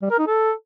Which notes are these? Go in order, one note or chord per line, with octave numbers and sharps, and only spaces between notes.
G3
A#4
D#4
A4